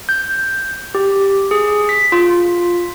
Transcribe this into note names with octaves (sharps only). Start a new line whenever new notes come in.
G6
G4
G#4
B6
F4